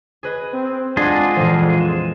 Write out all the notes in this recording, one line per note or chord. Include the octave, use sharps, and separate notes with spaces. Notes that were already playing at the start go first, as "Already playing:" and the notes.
G#4 B4 D#5
C4
G#3 D4 F4 G#4 F#5 D#6 D#7
F2 A#2 E3 F3
E7